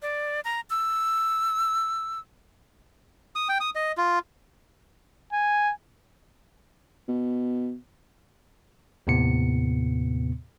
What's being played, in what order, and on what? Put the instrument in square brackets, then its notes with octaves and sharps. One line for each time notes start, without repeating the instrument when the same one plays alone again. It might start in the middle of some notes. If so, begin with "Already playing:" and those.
[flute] D5
A#5
E6
[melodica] D#6
G5
D#6
D#5
F4
[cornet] G#5
[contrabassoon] B2
[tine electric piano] D#2 A2 C3 B3 C#7